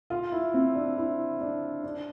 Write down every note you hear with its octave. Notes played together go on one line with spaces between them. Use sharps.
F4
E4
C4
D4
E4
D4
D4